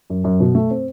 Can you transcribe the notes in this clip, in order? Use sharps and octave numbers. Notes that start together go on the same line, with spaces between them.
F#2
F#2
B2
A3
C4